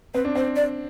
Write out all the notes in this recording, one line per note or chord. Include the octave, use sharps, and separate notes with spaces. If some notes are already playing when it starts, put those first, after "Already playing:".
C4 B4
D4
C4 C5
D5